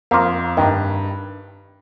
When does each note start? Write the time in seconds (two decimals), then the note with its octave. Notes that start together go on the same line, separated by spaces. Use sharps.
0.11 F2 A#3 F4
0.57 G2 D#3